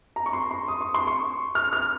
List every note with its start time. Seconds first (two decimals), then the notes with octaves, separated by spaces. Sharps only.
0.16 A#5
0.26 C#6
0.33 C6
0.51 C6
0.68 D#6
0.81 C#6
0.94 C6
1.07 C#6
1.55 F6
1.73 F6